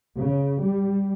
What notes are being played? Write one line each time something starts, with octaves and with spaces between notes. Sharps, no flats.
C#3
G3